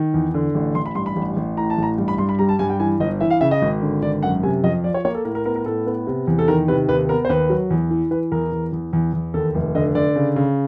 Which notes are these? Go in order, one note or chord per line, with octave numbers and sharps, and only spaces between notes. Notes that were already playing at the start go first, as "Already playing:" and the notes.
Already playing: D#3
E2
D3
A1
A1 C6
B5
G2 C6
B5
A1
A1
A2 A#5
A5
A1
A#5
G2
B5
G2 C6
B5
G3 A#5
A5
G2 G#5
G5
E3 G#5
G1 D#5
E3 E5
F5
C#3 E5
D#5
G#1
D3
G#1 D5
F#2 F#5
C3 G#5
F2 D#5
F3 D5
C#5
A#3 C#5
A4
A2 A#4
A#4
B3 A#4
A#4
A2 A4
B3
C3
E2
A4
D#3 A#4
C3 B4
D#2 B4
B3 A#4
C5
D#2 B4
F#3
E2
E3
E3 B4
E2 A#4
E2
E2
E2
E2
D#2 A4
F1
D3 D#5
D3 D5
C#3
C#3